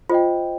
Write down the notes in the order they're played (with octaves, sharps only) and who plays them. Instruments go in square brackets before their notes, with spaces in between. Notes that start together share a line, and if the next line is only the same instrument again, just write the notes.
[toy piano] F4 [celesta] C5 D#5 G5